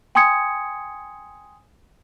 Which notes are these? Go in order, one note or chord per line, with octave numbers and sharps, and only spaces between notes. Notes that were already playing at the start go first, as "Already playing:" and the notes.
G5 G#5 C6 D#6 G#6 C#7